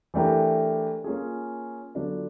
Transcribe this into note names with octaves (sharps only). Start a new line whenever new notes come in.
E3 A3 D4 G4 A#4
A#3 C#4 F4 G#4
D3 F#3 B3 D4 F4